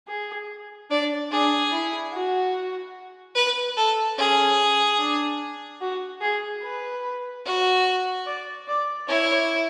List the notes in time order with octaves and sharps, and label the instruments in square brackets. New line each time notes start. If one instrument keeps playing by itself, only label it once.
[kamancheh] G#4
[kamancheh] D4 [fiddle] D5
[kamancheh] D4 [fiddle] G#4
[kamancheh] E4
F#4
[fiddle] B4
A4
[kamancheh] C#4 [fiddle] G#4
[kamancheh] D4
F#4
G#4
B4
[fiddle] F#4
[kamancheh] D5
D5
[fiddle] E4 [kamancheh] C#5